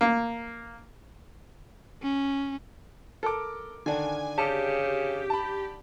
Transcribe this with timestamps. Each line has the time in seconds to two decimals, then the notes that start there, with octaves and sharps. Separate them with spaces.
0.01 A#3
2.02 C#4
3.23 A4 A#4 D6
3.86 D3 D#3 D4 G#5
4.38 C#3 G4 A5
5.30 A5 B5